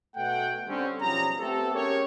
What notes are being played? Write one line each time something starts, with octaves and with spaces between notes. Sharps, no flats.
B2 A3 F#5 G5
D3 G3 C4 C#4
B1 F3 G3 C#4 G#4 A#5
A3 B3 C4 G4 A4
C#4 G4 G#4 A#4 C#5